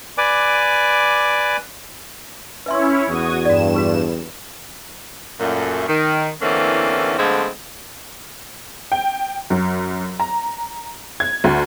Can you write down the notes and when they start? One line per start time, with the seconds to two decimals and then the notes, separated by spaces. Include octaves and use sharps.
0.18 B4 D5 G#5 D6
2.66 C#4 E4 B4 C#5 E5 C6
3.08 E2 F#4 D#6 G#6
3.45 G2 F#4 D5 E7
3.74 F#4 B4 C#6
5.40 F#2 A#2 A3
5.88 D#3
6.41 E2 D3 E3 A#3 C4 C#4
7.18 D3 F3 G#3 A3 B3 C4
8.92 G5
9.50 F#2
10.20 A#5
11.20 G#6
11.44 D2